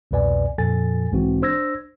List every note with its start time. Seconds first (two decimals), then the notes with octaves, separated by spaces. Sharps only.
0.11 C2 F2 B2 B4 D5 G#5
0.58 F2 A#2 F3 A4 G#5 A6
1.12 B1 G#2 E3 G#3 C4 F#4
1.42 D4 C5 E6 G#6 A#6